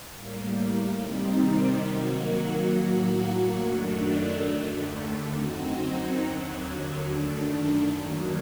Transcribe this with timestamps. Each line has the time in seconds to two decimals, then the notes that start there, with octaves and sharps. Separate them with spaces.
0.13 A2 G3 A#3
0.99 C3 D#3 G3 C4 D#4
1.85 D#3 F#3 A#3 F#4
2.72 A2 F#3 A#3 F#4
3.58 F#2 D#3 F#3 A3 D4
4.44 D#2 D3 A3
5.31 F#2 F#3 C4 D#4 F#4
6.17 D#2 D3 F#3
7.03 F#2 D#3 A3 D4
7.89 D#2 D#3 F#3 A#3